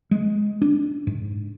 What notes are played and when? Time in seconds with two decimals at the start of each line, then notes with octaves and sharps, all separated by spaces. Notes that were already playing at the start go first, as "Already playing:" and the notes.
0.11 G#3
0.62 D4
1.07 G#2